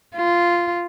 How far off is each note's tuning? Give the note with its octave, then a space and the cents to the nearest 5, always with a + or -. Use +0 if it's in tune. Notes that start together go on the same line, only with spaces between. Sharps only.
F4 -10